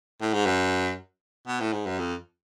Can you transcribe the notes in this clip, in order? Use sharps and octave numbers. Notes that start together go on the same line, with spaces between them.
A2
G#2
F#2
B2
A2
G#2
F#2
F2